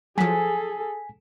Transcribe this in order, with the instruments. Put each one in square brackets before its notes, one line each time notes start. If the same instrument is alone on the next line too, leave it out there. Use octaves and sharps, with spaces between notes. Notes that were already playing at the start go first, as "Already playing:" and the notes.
[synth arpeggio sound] F3 F#3 [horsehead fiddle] G#4 A4 [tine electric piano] G#5 B6